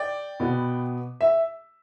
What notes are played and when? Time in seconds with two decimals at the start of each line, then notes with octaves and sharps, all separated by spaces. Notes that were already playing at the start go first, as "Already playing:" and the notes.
Already playing: D5 G5
0.40 B2 B3
1.21 E5